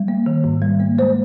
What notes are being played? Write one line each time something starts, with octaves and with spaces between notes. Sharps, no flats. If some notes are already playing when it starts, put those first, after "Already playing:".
Already playing: G3
A#3
D#3
G#2
G3
A#3
G#3 C5